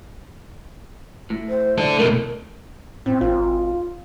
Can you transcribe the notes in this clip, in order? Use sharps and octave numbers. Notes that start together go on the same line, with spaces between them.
A2
C5
D4 A4
B2 A3 A#4
A2 C4
G#1 F4